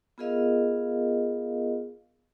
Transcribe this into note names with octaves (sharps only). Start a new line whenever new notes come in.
B3 F4 G#4 A#4 D#5 F5